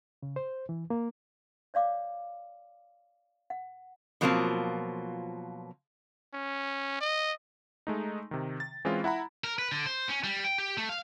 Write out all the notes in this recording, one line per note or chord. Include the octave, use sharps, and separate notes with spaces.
C#3
C5
E3
A#3
C#5 D5 F5 D6
F#5
B2 F3 F#3 A#3 C4 F4
C#4
D#5
G#3 A3 D#4
C3 D#3
A6
E3 G#3 C4 C#4 F4
E4 F#5 A#5 B5
A#4
B4
D3
C5
C#4
G3
G5
G4
A3
F5